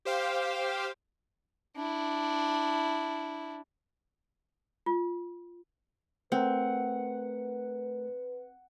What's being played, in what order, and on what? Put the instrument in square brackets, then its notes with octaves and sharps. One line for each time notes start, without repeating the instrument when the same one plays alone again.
[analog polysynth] G4 C5 F5 G5
[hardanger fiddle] D4 E4
[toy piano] F4
[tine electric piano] A3 A#4 [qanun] C4 [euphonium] B4 [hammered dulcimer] F#5